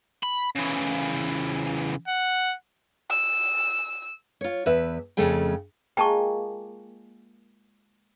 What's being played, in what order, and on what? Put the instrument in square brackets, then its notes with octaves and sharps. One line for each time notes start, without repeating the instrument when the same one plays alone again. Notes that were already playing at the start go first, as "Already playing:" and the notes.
[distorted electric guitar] B5
C#3 E3
[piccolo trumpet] F#5
[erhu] E6
[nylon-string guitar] F4 C#5
E2 B4 E5
F2 C#3 A3 G#4 G5
[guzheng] G#3 A#3 F4 [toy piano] G5 A5 C#6